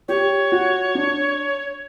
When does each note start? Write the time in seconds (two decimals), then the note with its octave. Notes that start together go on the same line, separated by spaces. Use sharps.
0.08 G4 C#5
0.52 F#4
0.95 D4